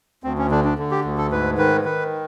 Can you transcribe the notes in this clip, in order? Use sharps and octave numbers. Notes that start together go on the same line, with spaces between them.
D2 C4
C#4
D3 D4
D4
D3
G4
D2
A4
G#2 B4
D#3 B4
D#3 B4